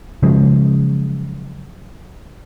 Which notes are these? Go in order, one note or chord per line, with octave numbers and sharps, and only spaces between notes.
C#3 F3 F#3 G#3